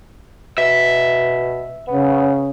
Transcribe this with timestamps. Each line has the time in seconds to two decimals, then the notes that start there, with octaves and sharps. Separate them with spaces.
0.58 B2 E5
1.88 C#3 B3